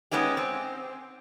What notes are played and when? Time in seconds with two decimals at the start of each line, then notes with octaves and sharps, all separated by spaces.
0.11 G#3 B3 C#4 D#4 G4
0.37 C4